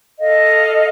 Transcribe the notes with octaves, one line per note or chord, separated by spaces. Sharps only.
A4 D#5 F5